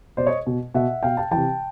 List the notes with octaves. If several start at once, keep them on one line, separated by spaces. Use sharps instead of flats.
B2 C5 D5
C#5 D#5
B2
B2 E5 F#5
B2 F5 G5
G5 A5
C3 E3 G5 A5